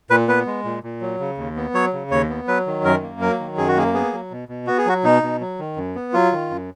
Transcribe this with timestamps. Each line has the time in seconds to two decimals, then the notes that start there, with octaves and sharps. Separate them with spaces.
0.10 A#2 B4
0.28 B3 B4
0.46 G#3
0.64 A#2
0.83 A#2
1.01 F#3
1.20 C#3
1.37 D#2
1.56 B3
1.74 F#3 C#5
1.93 C#3
2.11 D#2 C#5
2.29 B3
2.48 F#3 B4
2.67 D#3
2.84 F#2 A#4
3.03 A#3
3.21 F#3 A#4
3.39 D#3
3.58 F#2 G#4
3.68 F#4
3.76 A#3 G#4
3.94 B3 G#4
4.13 F#3
4.31 B2
4.48 B2
4.67 B3 F#4
4.78 G#4
4.86 F#3 F#4
5.04 B2 D#4
5.23 B2
5.41 F#3
5.59 D#3
5.77 F#2
5.95 B3
6.13 F#3 F4
6.32 D#3
6.50 F#2